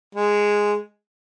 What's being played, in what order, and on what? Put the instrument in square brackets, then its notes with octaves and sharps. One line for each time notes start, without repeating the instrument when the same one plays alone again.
[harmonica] G#3